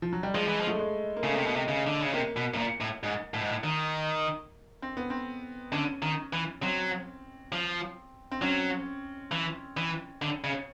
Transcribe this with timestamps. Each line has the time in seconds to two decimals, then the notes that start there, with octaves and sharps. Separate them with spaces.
0.02 F3
0.13 F#3
0.23 G3
0.34 F3 G#3
0.48 E3
0.61 F3
0.67 A3
0.79 G#3
1.17 A#3
1.23 C#3 A3
1.36 C3
1.46 B2
1.56 C3
1.68 C#3
1.87 D3
2.01 C#3
2.14 C3 A#3
2.37 B2
2.54 A2
2.58 A#2
2.81 A2
3.03 G#2
3.34 A2
3.41 G#2
3.49 A2
3.64 D#3
4.82 C4
4.97 B3
5.10 C4
5.72 D3 C#4
6.02 D#3
6.33 E3
6.63 F#3 C4
7.52 F3
8.32 C4
8.42 F#3 C#4
9.32 E3
9.77 E3
10.22 D3
10.44 C#3